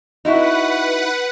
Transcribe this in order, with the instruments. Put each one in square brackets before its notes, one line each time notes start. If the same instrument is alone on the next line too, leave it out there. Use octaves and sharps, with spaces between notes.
[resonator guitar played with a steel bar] D#4 E4 F#4 [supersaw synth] B4 F#5